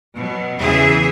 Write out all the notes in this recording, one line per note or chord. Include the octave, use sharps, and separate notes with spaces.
B2 F#3
E2 C#3 E3 G#4 E5